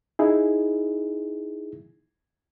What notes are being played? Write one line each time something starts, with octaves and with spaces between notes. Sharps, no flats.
D#4 E4 G#4